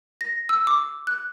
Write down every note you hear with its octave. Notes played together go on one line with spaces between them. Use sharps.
A#6
E6
D6
F#6